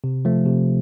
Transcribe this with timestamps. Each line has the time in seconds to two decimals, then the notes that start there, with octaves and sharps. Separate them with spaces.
0.04 C3
0.25 F3 A3
0.46 C3